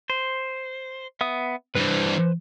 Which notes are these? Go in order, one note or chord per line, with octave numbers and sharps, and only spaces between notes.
C5
B3 E5 D#6
G2 E3 B4 C5